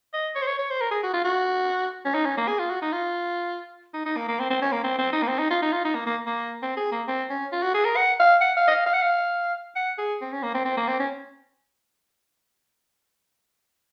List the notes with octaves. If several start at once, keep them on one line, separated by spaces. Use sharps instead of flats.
D#5
C#5
C5
C#5
C#5
C5
A#4
G#4
F#4
F4
F#4
C#4
D#4
C#4
A#3
G#4
F4
F#4
D#4
F4
D#4
D#4
A#3
A#3
C4
C4
C#4
A#3
C4
C4
D#4
A#3
C4
D#4
F4
D#4
F4
D#4
A#3
A#3
A#3
C4
G#4
A#3
C4
C#4
F4
F#4
G#4
A#4
F#5
F5
F#5
F5
D#5
F5
F5
F#5
F5
F#5
G#4
C4
C#4
A#3
C4
C4
A#3
C4
C#4